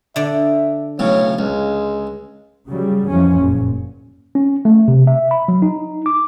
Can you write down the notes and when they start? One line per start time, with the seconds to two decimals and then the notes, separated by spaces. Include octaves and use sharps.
0.16 D3 D5 E5
0.99 B1 A2 C#3 C#5
1.39 C#2 G#3
2.66 C#3 F#3 G3
3.09 F2 E3 F3 C#4
3.40 F#1 A#2
4.35 C#4
4.65 A3
4.88 C3
5.07 E5
5.31 B5
5.48 F#3
5.62 D#4
6.06 D6